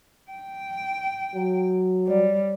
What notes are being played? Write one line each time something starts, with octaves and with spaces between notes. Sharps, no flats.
G5
F#3
G3 C#5 D5